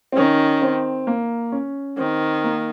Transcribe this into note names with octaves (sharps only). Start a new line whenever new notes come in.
C4
D#3 C#4
C4
A#3
C#4
D#3 C4
A#3